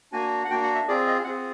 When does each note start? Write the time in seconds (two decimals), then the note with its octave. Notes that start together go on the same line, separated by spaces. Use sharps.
0.12 A#3 D4 F#4 G#5
0.45 F#5
0.50 A#3 D4 F#4 G5
0.63 F#5
0.74 E5
0.88 C4 F4 G#4 D5
1.07 D#5
1.24 C4 F4 G#4 F#5